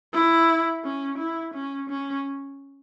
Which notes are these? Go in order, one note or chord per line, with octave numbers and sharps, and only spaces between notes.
E4
C#4
E4
C#4
C#4